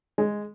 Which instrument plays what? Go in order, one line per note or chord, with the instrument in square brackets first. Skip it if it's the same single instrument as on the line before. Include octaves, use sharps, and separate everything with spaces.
[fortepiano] G#3